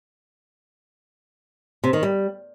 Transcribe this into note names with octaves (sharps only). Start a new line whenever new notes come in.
C3
D#3
G3